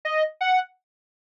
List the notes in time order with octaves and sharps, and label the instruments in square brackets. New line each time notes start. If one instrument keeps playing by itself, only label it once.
[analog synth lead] D#5
F#5